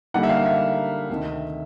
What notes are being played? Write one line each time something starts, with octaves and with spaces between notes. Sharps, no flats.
D3 G3 A#3 D#4 F#5
E5
F5
E5
D2 C3 D#3